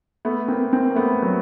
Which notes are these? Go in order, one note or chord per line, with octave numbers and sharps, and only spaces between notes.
A3 B3
A#3 C4
A#3 C4
A#3
A3 B3
F#3